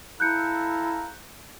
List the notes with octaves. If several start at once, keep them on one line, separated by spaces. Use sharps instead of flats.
E4 A4 F5 A#5 F#6 G6 C#7